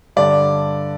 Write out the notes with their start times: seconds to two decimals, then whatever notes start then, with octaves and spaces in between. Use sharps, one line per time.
0.16 G2 D3 D5